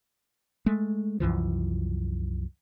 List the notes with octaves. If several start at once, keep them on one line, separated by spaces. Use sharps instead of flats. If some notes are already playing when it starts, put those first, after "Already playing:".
G#3 A3
C2 F#2 E3 F3